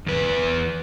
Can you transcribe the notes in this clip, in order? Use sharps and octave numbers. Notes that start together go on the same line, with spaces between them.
E2 B4